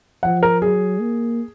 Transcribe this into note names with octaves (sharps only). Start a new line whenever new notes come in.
F3 F#5
A#4
F#3 G#4
A#3